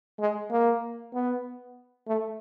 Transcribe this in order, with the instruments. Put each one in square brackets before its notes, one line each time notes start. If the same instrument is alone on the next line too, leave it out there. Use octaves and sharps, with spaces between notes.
[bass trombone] G#3
A#3
B3
A3